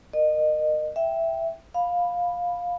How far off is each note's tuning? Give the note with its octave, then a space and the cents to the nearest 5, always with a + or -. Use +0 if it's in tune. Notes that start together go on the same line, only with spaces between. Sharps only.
A#4 +0 D#5 -30
E5 +5 G5 +0
F5 +15 B5 +0